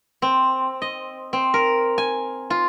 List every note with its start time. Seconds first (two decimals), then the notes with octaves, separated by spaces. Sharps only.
0.22 C4
0.82 D#5
1.33 C4
1.54 A#4
1.98 G#5
2.50 F4